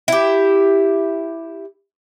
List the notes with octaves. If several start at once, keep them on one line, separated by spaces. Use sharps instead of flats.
E4 G4